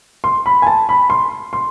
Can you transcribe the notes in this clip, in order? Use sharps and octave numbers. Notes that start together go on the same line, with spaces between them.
C6
B5
G#5
A5
B5
C6
C6